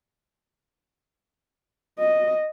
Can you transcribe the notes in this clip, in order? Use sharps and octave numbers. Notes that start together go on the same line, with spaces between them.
D#5